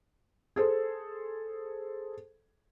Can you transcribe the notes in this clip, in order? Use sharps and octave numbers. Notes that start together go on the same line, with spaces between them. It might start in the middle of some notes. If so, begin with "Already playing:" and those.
G#4 A4 C5